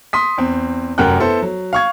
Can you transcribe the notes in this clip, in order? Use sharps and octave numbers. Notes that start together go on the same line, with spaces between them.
C6 D#6 B6
E2 C4
F1 F#2 A#4 F#5 G5 F#6
B3 E4 A4 C5
F#3
F5 C#6 G#6